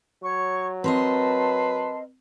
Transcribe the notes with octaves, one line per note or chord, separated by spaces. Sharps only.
F#3 C#5 C#6
C4 A#4 B4 D#5 A5 C6